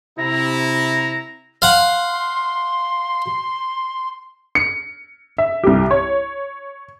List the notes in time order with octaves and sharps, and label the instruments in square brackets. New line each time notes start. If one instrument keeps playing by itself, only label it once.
[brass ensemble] C3 E4 [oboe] A#5
[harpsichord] F5 F#5 [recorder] C6
[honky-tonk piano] C#7
E5
C2 G4
C#5